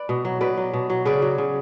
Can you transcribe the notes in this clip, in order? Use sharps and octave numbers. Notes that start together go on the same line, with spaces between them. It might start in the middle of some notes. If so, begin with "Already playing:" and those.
Already playing: B4 D5
B2
F#3
B2 B4 D5
F#3
B2
F#3
C#3 B4 D5
F#3
C#3